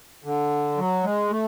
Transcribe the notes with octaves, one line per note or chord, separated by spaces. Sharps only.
D3
F#3
G#3
A3